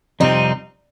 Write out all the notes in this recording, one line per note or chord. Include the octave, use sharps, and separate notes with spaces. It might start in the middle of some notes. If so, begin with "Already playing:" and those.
F2 C3 G3 C4 D#4